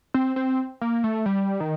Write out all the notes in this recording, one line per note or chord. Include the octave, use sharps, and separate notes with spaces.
C4
C4
A#3
A3
G3
D#3